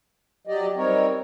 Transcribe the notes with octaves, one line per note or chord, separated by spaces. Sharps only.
F#3 G4 D5 D#5
G3 C4 D#4 A#4 C#5